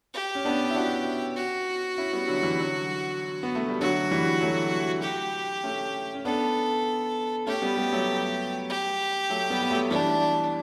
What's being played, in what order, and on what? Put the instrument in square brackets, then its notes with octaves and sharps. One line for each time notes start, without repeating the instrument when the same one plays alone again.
[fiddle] G4
[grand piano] C#4
B3 D4
E4
D4 F#4
[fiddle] F#4
[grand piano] C#4 E4
G3 B3
D3 F#3
E3 G3
D3 F#3
B3
A3
G3
[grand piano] D3 F#3 [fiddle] F#4
[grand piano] E3 G3
F#3 A3
[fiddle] G4
[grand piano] A3 C#4
C#4
[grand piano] B3 D4 [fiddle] A4
[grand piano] A3 C#4 [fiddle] G4
[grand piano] G3 B3
G3 B3
F#3 A3
[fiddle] G4
[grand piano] F#3 A3
G3 B3
B3
F#3 A3
[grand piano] E3 G3 [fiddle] D4